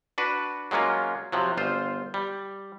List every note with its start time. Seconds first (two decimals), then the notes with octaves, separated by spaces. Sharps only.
0.18 D4 F#4 B4
0.71 F#3 G#3 A#3 C#4 F4
1.32 C3 F3 F#3
1.57 G1 F4 C5
2.14 G3